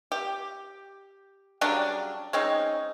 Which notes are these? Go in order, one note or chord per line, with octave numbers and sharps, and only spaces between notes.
G4
C#3 F#3 G3 D4
G#3 C4 C#4 D#4